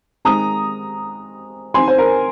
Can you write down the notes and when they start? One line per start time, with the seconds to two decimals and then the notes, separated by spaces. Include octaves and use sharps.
0.25 D#3 G#3 C4 A#5 D#6
1.74 D#3 C4 G#5 C6
1.88 C5
1.98 A#4